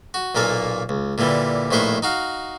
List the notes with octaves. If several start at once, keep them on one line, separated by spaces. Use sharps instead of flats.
F#4
B1 A#2 A#3 A4 G#5
C#2
A#2 D3 E3 G3
A#1 A2 D#3 B4 C5 C#6
D#4 F#4 F5